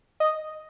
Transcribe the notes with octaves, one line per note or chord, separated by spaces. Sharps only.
D#5